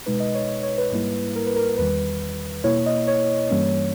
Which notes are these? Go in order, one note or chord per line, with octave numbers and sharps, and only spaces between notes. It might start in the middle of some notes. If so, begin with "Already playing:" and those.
B2 G#3 D#4 B4
D#5
C#5
C#5
C#5
B4
G#2 G3 A#3 E4
A#4
B4
A#4
E2 D#3 G3 B4
B2 A#3 E4 C#5
D#5
C#5
G2 E3 G3 A#3 C#4